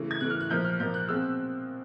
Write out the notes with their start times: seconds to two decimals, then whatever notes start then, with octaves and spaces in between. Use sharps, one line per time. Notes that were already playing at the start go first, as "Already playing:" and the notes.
Already playing: C#3 E3 A3
0.11 G#6
0.20 C#3 E3 A3 F#6
0.30 F6
0.40 F#6
0.50 A#2 F3 A#3 G6
0.64 F6
0.79 A#2 F3 A#3 G6
0.94 F#6
1.09 B2 G#3 C4 E6